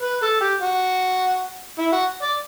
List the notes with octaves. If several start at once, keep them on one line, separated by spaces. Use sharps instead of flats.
B4
A4
G4
F#4
E4
F#4
D5